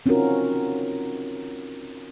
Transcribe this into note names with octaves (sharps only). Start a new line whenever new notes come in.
C4 C#4 D#4 F4 F#4 A#4